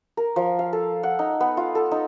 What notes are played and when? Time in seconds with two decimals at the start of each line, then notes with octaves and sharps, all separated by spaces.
0.17 A#4
0.36 F3
0.59 F5
0.73 A4
1.03 F#5
1.19 D#4
1.41 B3
1.57 F4
1.75 A4
1.92 D#4